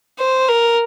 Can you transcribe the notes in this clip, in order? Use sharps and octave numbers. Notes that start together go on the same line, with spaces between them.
C5
A#4